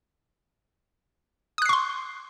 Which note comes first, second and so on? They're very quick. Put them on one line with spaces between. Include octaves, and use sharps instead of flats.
D#6 F#6 C7 C#6 C6